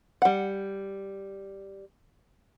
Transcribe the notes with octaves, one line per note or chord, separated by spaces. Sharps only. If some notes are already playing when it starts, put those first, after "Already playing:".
G3 F#5